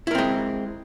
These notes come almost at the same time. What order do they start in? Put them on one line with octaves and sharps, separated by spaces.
E4 A#4 C4 G#3